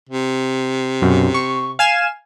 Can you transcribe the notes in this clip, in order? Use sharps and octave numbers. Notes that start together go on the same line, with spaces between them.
C3
B1 F#2
C#6
F5 G#5 E7